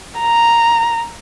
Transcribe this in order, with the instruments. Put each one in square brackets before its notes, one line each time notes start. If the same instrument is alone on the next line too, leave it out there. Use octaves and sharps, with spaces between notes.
[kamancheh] A#5